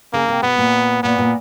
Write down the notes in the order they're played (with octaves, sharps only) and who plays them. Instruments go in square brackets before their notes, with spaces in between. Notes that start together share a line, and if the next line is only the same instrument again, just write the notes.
[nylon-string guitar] C#3 [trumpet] A#3
[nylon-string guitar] C3
[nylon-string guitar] B2 [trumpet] B3
[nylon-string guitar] A#2
[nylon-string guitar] A#2 [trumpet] B3
[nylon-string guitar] A#2